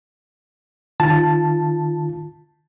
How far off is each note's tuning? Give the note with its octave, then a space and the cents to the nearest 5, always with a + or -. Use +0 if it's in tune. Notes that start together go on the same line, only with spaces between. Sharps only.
D#3 -30 F4 -10 A5 +0